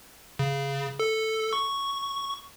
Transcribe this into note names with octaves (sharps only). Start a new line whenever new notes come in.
C#3
A4
C#6